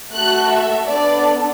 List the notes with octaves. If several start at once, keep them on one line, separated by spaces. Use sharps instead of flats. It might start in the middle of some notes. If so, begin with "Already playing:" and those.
A3 F#4 A4 F#6
E5
B3 D4 A4 D5